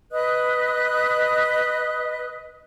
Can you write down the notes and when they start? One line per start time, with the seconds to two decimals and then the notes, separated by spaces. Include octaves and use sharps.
0.11 B4 D#5 D#6 F#6